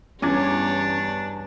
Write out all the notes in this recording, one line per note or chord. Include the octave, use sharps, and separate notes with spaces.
E2 G2 C#4 D4 C#5 D6 G#6